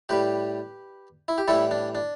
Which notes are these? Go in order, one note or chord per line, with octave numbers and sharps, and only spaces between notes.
A2 G3 G4 B4
E4
G4
A2 E3 G3 E4 A4
D4
D4